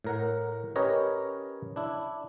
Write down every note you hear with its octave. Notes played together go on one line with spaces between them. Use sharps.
A2 A#4 F#5
C#4 G4 A#4 B4 C#5 D#5
D4 E4